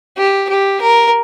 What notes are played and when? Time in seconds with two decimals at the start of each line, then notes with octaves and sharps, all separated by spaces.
0.18 G4
0.49 G4
0.81 A#4